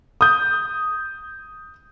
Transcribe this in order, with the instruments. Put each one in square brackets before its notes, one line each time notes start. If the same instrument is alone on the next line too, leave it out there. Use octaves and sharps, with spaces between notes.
[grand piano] D#6 G6